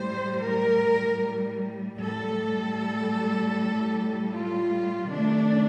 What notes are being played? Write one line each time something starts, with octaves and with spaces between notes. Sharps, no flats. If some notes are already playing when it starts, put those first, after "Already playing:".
Already playing: A2 G3 C5
A#4
A2 G3 A4
F4
C3 D#3 A3 D4